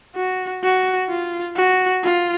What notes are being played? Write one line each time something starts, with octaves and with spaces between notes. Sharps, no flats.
F#4
F#4
F4
F#4
F4